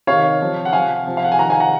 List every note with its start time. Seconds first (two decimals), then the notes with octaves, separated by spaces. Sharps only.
0.07 C3 D#3 C#5 F5
0.41 C3 F3
0.65 F#5
0.73 C3 F3 F5 G#5
1.06 C3 F3
1.17 F5
1.24 F#5
1.32 G#5
1.39 C3 D#3 F#5 A#5
1.50 F5 G#5
1.60 F#5 A#5